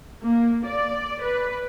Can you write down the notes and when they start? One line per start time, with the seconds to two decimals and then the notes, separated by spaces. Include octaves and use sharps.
0.23 A#3
0.66 D5
1.24 B4